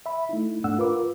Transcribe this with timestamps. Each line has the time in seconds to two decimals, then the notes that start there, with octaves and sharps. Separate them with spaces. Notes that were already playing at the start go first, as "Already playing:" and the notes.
0.06 E5 B5
0.29 A3 D#4 E4
0.64 G#2 A3 D4 F#5 E6
0.78 F4 A#4 B4 D6